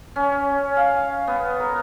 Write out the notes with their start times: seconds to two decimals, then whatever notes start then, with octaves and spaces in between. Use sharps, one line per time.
0.16 C#4
0.77 F5
1.27 B3
1.60 A#4